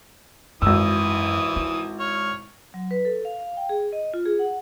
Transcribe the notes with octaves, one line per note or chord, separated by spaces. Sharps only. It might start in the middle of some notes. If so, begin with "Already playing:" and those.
G#1 F#2 E3 D#6 E6
E4
C#5 F6
F#3
B4
A4
F5
F5
G5
G#4
D#5
F4
G#4
F#5